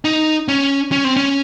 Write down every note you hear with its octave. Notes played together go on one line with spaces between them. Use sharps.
D#4
C#4
C#4
C4
C#4